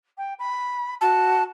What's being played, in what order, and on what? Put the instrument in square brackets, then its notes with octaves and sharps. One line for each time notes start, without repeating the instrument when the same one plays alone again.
[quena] G5
B5
[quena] F#4 [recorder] A5